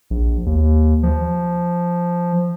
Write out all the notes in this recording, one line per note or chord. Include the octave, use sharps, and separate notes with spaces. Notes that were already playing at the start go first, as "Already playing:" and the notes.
A#1
D#2
F3